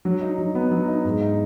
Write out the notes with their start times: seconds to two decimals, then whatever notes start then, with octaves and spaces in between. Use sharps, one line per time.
0.05 F#3
0.21 D#4
0.39 F#3
0.55 B3
0.71 F#3
0.88 D#4
1.05 G#2
1.22 D#4